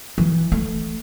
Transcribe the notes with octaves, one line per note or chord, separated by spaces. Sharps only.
E3
A3